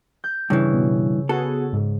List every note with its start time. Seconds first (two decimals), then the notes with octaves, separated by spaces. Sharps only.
0.24 G6
0.50 G2 C#3 E3
0.73 B2
1.29 B3 F#4 G#4 A4
1.73 G#2